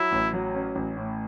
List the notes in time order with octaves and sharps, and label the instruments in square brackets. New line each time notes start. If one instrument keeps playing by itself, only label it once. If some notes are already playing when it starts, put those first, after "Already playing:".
Already playing: [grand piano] F#3 [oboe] E4
[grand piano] A1
F#3
C#4
A1
A2